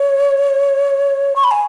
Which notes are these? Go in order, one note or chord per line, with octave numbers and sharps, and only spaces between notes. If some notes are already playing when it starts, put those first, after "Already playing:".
Already playing: C#5
C#6
B5
G#5